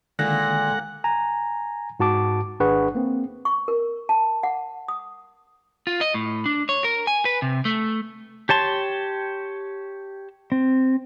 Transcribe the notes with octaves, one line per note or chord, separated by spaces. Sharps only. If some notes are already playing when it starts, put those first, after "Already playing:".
A#2 D3 D#3 G#3 A#3 A4 F#5 A#6
G#5 A#5
G#2 F#4 A5 D6
G#1 D4 G#4 B4 F#5 C#6
A#3 C4
C#6
A#4
A5
F#5
D#6
F4
D#5
A2
D4
C#5
A#4
G#5
B4
C3
A3
G4 C#5 A5 C6
C4